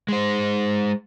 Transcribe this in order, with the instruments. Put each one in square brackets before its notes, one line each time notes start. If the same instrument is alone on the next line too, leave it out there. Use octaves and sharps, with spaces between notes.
[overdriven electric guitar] G#3 C5